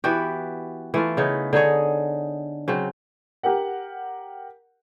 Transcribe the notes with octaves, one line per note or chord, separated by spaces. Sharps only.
E3 B3 F#4 G4
E3 A3 F4
C#3 B3 D#4 C#5
D3 D#4 G#4 C#5
C#3 F#3 C4
G4 A#4 F#5